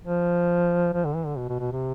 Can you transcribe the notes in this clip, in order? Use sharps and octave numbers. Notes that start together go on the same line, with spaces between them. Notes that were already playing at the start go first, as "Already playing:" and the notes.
F3
F3
D3
E3
D3
B2
B2
B2
C3